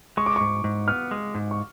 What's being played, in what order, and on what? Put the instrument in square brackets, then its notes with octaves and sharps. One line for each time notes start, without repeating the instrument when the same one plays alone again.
[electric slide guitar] G#3 [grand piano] C#6
[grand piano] D6
[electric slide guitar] G#2 [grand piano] C#6
[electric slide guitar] G#2
[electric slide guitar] B3 [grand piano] F6
[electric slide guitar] G#3
G#2
[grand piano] C#6